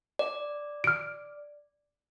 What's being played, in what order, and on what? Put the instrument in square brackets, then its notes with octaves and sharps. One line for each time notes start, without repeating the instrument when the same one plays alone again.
[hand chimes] D5
[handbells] F6 D7